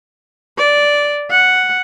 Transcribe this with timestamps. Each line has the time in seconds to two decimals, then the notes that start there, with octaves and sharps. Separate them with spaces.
0.58 D5
1.30 F#5